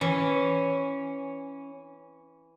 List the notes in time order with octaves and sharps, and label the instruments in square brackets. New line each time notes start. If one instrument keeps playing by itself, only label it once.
[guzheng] E3 [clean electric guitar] C#4